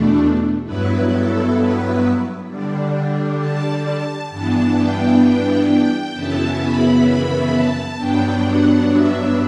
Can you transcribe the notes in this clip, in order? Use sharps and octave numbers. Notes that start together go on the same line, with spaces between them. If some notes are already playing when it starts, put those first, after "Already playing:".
Already playing: E2 B2 A3 D4
G2 F#3 B3 E4 B4
A4
B4
D3 G3 D4
A5
A5
G2 E3 B3 D4 A5
G5
G5
G5
F#2 C#3 E3 B3 E4 A5
B5
B5
A5
G2 F#3 B3 D4 G5
F#5
E5